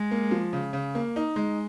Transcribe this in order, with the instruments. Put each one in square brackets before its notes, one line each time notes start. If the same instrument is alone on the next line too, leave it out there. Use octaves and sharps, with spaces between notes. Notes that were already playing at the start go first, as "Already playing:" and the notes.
Already playing: [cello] G#3
[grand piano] A#3
F3
C#3
C#3
A#3
D#4
G#3